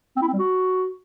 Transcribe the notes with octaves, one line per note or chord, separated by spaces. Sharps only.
C4
E4
C4
G3
F#4